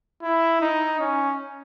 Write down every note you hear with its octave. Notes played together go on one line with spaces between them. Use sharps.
E4
D#4
C#4